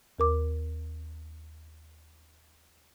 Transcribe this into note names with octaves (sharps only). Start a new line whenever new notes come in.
D#2 A#4 D6